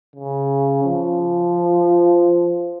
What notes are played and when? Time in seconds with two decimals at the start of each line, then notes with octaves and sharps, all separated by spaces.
0.15 C#3
0.84 F3